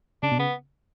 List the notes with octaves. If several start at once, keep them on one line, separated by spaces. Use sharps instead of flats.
C#3 D4
B2
C#3 B3